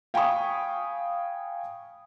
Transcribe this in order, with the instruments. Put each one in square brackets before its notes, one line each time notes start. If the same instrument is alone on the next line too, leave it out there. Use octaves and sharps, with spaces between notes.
[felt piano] F5 G5 G#5 B5 C#6 D#6